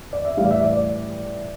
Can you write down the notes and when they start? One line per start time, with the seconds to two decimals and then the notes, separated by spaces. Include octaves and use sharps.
0.13 D5
0.25 E5
0.37 A2 E3 G3 F5
0.45 D5
0.51 E5
0.63 D5
0.77 D5